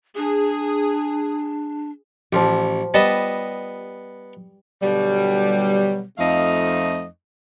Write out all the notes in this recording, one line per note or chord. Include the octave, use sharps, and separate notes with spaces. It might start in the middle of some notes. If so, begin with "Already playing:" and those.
D4 G#4
A1 F3 F4 G4
G3 B3 D#5 A5
B2 D3 F#3 G3
F2 F3 A3 D#4 D#5 F5